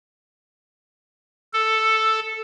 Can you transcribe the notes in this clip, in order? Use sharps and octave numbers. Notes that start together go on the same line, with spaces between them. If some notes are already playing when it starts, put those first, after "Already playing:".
A4